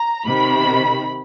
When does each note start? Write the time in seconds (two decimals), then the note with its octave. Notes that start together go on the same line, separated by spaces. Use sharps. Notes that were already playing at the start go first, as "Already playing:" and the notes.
Already playing: A#5
0.26 C3 D#3 B5